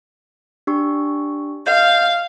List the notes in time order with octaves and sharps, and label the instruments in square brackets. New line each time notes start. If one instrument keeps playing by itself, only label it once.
[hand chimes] D4 G4 C#6
[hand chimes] D#5 G6 [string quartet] F5